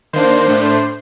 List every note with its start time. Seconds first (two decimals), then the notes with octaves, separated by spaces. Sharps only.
0.13 D#3 A#3 D4 C5 C6
0.46 A2 A3 D4